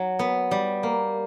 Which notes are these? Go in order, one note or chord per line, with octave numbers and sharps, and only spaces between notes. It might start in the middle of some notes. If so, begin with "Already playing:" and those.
Already playing: F#3
B3
G3
A#3